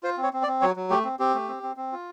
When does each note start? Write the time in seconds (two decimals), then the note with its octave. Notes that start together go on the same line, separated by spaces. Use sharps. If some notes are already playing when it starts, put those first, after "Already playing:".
0.03 F4 C5
0.18 C4
0.23 C#5
0.33 C4
0.43 D5
0.47 C4
0.62 F#3 C#5
0.76 F#3
0.90 A3 G4
1.05 C4
1.19 C4 G4
1.34 A3
1.48 C4
1.63 C4
1.77 C4
1.92 F4